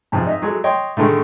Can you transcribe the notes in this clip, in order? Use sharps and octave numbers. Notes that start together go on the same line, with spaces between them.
F2 G#2 C3 F3
D#4 D#5 E5
F#3 G#3 G#4 A4
C#5 D#5 G5 C6
A2 D3 D#3 G#3 A3